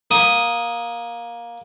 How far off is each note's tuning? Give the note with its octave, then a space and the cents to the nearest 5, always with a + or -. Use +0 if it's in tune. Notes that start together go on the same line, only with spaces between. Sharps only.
A#3 +15 D#6 +0